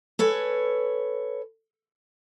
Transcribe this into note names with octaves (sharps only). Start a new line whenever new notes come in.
A4 B4 C#5 G#5